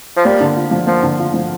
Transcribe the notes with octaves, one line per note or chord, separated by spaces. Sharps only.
F3
G3 A#3
D3
F4
F3
F3 A#3
D3
F4
F3